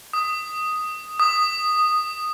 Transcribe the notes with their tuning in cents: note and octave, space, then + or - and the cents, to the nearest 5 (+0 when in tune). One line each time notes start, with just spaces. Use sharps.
D#6 +0
D#6 -10